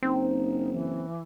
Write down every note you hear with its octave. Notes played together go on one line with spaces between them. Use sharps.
F#1 C4 D#4
E3